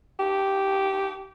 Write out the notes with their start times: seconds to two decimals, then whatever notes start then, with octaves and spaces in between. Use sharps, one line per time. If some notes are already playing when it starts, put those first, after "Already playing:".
0.19 G4